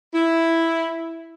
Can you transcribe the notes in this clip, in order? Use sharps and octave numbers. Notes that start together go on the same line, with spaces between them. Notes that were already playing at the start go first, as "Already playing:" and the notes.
E4